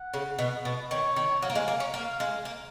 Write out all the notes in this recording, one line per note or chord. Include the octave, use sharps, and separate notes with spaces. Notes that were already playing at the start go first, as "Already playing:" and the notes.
Already playing: F#5
C#3
B2
B2
D#3 C#5
D#3
F#3 F5
A#3
G#3
A#3
C#4
A#3 F5
G#3
A#3